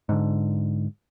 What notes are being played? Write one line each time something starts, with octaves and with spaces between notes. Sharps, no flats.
G#2 D3